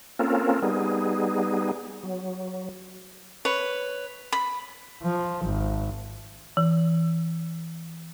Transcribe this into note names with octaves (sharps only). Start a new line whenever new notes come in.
A#3 C4 C#4 F4 A4 A#4
G3 B3 D#4 G#4
F#3
B4 C#5
B5
F3
G#1
E3